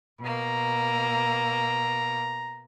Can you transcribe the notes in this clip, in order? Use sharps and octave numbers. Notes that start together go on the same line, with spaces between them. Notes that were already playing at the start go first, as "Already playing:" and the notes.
B2 A#3 A#5